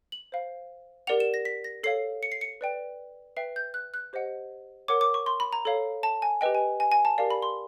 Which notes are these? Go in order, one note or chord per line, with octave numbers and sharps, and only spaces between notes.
F#7
C5 F5
G4 A#4 D5 F#5 F7
E7
A#6
B6
A#6
A4 C#5 F5 C7
C#7
C7
C#7
B4 D5 G5
B4 E5 G5 C7
G6
F#6
F#6
G4 C5 D#5 F#5
A#4 C#5 F#5 D6
D6
C#6
C6
B5
A#5
A4 C#5 F5
A5
G#5
G4 B4 D#5 G5
G#5
G#5
G#5
A5
G4 A#4 D5 F5
B5
C6